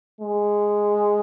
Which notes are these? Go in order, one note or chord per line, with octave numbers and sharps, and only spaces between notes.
G#3